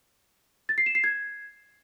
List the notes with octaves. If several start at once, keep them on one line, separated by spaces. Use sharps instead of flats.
A6
C7
E7
C7
G#6